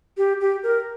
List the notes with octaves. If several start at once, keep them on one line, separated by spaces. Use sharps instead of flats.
G4
G4
A#4